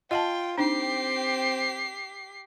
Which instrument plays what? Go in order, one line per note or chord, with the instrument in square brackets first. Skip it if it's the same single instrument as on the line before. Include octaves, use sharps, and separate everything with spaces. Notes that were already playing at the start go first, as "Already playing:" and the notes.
[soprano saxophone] F4 [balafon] D#5 F#5 A5 [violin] G5
[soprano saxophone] C4 [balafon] D4 D#4 [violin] G4 C7